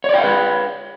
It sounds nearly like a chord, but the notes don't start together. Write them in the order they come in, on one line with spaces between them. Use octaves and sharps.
C#5 D5 G5 F5 B4